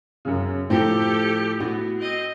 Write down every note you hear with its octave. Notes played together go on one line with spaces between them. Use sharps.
F#2 C#3
A2 F3 C4 F4 G4 A4
B3 F#4
C4 D#5